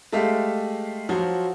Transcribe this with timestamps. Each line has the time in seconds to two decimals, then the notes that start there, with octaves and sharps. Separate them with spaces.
0.12 G#3 A3 G4 A4 E5 F5
1.09 F3 F#3 F#4